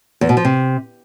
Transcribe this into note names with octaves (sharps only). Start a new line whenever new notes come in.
E2
B2
F3
C3